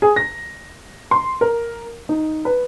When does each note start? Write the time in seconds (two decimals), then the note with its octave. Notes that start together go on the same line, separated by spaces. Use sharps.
0.02 G#4
0.16 A#6
1.11 C6
1.41 A#4
2.09 D#4
2.45 B4